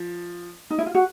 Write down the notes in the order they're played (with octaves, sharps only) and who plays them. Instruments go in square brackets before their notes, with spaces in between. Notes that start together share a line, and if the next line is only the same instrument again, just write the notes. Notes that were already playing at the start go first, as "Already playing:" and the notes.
Already playing: [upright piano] F3
[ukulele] D#4
E4
F4
F#4